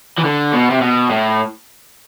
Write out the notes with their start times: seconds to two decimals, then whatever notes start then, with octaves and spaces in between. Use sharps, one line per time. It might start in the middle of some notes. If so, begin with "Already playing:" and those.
0.18 E3
0.25 D3
0.53 B2
0.70 C3
0.81 B2
1.10 A2